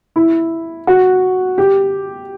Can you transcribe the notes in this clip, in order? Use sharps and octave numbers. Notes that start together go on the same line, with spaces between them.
E4
F#4
G4